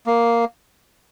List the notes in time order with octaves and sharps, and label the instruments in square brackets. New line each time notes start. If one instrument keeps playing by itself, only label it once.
[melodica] A#3